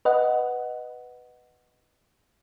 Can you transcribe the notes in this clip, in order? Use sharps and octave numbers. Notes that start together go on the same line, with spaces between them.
B4 D#5 F#5